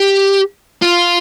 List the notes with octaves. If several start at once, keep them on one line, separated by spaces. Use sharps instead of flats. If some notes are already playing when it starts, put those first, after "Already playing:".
Already playing: G4
F4